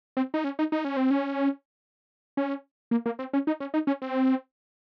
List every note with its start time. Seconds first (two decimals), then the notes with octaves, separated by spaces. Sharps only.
0.17 C4
0.34 D#4
0.44 C#4
0.59 D#4
0.72 D#4
0.85 C#4
0.97 C4
1.11 C#4
2.37 C#4
2.91 A#3
3.06 A#3
3.19 C4
3.33 C#4
3.47 D#4
3.60 C#4
3.74 D#4
3.87 C#4
4.02 C4